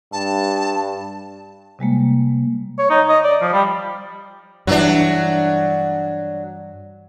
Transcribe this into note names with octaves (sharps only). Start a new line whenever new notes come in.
G2 A5
C3 G3 G#3 A#3
C#5
D#4
D#5
D5
F3
G3
G2 E3 F#3 D4